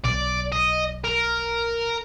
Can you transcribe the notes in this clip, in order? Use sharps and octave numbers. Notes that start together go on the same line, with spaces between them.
B1 D5
D#5
A#4